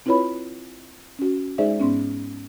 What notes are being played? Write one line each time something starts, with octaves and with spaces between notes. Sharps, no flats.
C4 E4 F4 B4 C#5 B5
C#4 F#4
G#3 D#4 G#4 C5 D5 E5
G#2 B3 C#4